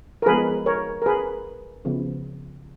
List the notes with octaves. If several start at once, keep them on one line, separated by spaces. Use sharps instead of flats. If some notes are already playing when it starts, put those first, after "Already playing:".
A#4
F3 G#3 B3 G#4 B4
A#4 C#5
A#4
G#4 B4
C#3 F3 B3